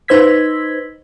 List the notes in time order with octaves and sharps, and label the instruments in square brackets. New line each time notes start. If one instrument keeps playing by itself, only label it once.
[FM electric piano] D#4 B4 C5 E6 G#6 B6